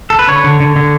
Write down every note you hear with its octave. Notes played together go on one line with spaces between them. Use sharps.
A4
B4
D3 C#5
D3
D3
D3